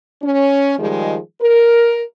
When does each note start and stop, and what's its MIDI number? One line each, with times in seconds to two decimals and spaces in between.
0.22 0.76 61
0.78 1.17 51
0.78 1.17 53
0.78 1.17 55
0.78 1.17 56
1.41 2.03 70